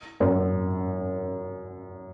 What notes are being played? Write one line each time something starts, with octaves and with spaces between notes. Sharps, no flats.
F#2